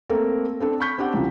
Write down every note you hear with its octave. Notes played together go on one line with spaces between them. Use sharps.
A3 A#3 C4 A4 A#4
C4 D4 A4
B5 C#6 G6 B6
C4 D4 G4 F#5
C2 C#3 F3